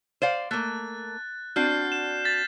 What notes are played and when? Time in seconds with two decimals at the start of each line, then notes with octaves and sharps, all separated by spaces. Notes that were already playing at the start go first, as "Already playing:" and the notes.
0.22 C5 D5 F5
0.51 A3 A#3 F#6 A6
1.56 C4 D4 F#4 F6 G6 C7
1.92 E7
2.25 A6 B6